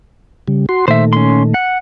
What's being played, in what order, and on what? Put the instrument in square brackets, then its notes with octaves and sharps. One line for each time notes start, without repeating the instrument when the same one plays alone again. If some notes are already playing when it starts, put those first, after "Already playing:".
[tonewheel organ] C#3 G3
F#4 C6
[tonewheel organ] A#2 D#3 A3 [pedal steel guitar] C5 E5
[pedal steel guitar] C#4 C6
F#5